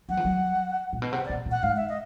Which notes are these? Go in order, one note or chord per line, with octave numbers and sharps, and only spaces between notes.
F#3 F#5
F3
F#3
A#2
B2
C3 F#5
D5
B2
A#2
F#5
G#2 F5
E5
D#5